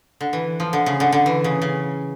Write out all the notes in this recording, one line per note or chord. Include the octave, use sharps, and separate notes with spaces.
D3
E3
F3
D3
C#3
D3
D3
E3
C#3
C#3